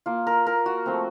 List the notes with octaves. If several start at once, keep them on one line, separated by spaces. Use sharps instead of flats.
A#3 F4
A#4
A#4
F#4
F3 A3 C4